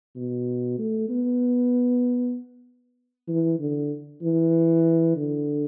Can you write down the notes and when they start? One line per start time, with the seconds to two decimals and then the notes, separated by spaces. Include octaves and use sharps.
0.16 B2
0.78 A3
1.09 B3
3.28 E3
3.60 D3
4.22 E3
5.16 D3